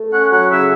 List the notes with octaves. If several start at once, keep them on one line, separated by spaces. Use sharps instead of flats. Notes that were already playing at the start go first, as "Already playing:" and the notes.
Already playing: A3
C#4 F#5
F#3 F#5
C#3 E5